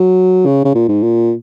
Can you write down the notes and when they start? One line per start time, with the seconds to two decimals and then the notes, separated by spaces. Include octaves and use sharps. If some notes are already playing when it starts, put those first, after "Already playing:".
Already playing: F#3
0.46 C#3
0.65 C#3
0.75 A#2
0.88 G#2
1.03 A#2